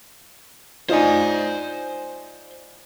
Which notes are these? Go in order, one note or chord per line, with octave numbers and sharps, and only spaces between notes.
D4 D#4 F4 C5 G#5